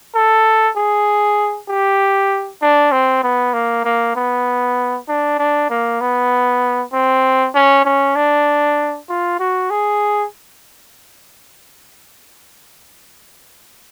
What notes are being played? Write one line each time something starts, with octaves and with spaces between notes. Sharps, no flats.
A4
G#4
G4
D4
C4
B3
A#3
A#3
B3
D4
D4
A#3
B3
C4
C#4
C#4
D4
F4
F#4
G#4